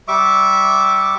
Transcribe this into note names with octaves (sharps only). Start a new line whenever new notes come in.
G3 E5 C#6 D6